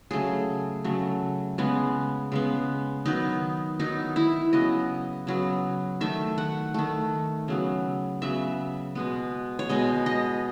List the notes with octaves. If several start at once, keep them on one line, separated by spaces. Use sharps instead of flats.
C#3 F#3 A3 G#4
C#3 F#3 A3
C#3 G#3 B3
C#3 G#3 B3
D#3 F#3 B3 D#4
D#3 F#3 B3 D#4
E4
C#3 F#3 B3 D#5
C#3 F#3 B3
D#3 A3 E5
F#5
D#3 A3
C#3 F#3 B3
C#3 F#3 B3 E5
B2 G#3 B3
C#5
B2 G#3 B3 D#5
D#5